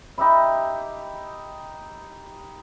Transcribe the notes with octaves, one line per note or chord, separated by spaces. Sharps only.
D#4 G4 E5 B5